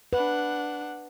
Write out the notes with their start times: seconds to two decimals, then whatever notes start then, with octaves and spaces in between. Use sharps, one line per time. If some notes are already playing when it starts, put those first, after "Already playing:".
0.13 D4 B4 F#5